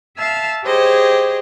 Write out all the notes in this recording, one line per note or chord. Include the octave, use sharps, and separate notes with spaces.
E5 F5 A5 E6 F6
G4 G#4 C5 C#5 D#5